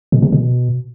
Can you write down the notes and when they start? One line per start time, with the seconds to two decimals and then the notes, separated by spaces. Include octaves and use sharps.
0.12 B2
0.22 C3
0.32 B2